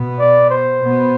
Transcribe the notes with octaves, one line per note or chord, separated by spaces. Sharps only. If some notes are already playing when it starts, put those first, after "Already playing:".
Already playing: B2 B3
D5
C5
B2 B3